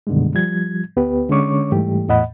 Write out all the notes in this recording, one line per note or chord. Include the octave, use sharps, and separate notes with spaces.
F#2 B2 D3 D#3 G3 G#3
F3 G3 G#6
D2 B3 G4 B4
D3 G#3 C#4 C#5 C#6 D6
G#2 E3 G3 A3 G4
E2 A2 D#5 F#5 B5